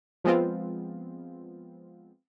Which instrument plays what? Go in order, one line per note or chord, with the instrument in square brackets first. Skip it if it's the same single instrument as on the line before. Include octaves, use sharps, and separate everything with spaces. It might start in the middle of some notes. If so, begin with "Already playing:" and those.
[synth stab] F3 G#3 B3 C4 F4